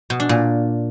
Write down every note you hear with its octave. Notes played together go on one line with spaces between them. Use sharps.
B2
D4
A#2